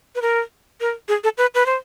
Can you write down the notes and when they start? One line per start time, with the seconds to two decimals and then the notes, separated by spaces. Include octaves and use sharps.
0.15 B4
0.22 A#4
0.81 A#4
1.08 G#4
1.24 A4
1.38 B4
1.55 B4
1.66 C5